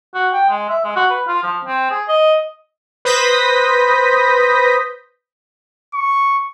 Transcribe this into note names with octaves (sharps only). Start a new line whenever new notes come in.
F#4
G5
G#3
E5
G#3
F#4
B4
F4
F3
C4
G#4
D#5
B4 C5 D#6 G6 A#6 B6
C#6